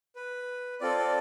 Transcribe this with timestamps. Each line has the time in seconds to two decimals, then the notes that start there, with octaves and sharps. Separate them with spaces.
0.16 B4
0.81 C4 F4 A4 D5
0.98 D5